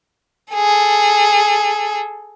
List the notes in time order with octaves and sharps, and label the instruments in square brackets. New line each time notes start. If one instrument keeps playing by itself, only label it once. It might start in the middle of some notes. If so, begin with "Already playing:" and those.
[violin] G#4 A4